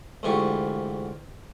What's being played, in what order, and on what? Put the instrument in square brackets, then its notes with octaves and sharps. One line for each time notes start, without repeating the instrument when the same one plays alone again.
[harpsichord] D2 G#2 E3 F4 G4 C#6